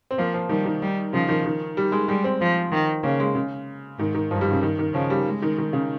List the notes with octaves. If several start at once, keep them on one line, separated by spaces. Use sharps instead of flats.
C4
F3 A#3
F3
D#3 G3
D#3
G3
C#3 F3
D#3
D#3
G3
G#3
G3 G#3
C4
F3
D#3
C#3 A#3
G#3
C#3
G#2 D#3
D#3
G2 F3
G3
C#3
D#3
D#3
C#3 F3
G3
G#3
D#3
D#3
C#3